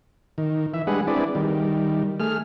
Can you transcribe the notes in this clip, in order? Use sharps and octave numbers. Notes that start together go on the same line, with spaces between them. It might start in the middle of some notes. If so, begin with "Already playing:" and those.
D#3
E3 E5
G3 G#3 D4 G#4 B4 F#5
C4 D4 E4 G#4 B4 D5
D#3 G3
A3 G#4 F6